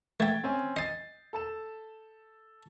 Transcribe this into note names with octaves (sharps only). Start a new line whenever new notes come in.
A3 E5 G5 G#6 A6
C4 C#4 G#5
D#5 G#5 A6 C7
A4 A5 E7